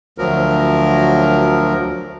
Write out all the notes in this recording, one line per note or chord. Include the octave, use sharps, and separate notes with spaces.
D2 F3 F#3 A#4